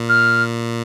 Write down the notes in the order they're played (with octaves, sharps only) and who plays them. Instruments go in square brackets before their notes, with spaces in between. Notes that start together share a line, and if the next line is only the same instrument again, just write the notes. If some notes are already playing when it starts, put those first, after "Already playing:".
Already playing: [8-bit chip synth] A#2
[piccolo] F6